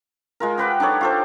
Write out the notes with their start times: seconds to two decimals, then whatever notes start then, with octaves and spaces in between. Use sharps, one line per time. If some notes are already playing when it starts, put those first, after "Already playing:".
0.40 G#3 F4 A#4
0.58 G4 B4 F#5 G5
0.80 D4 D#4 A4 C#5
1.01 F4 A4 C5